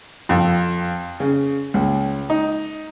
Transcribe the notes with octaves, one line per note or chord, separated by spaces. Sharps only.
F2
C#3
C#2
D#4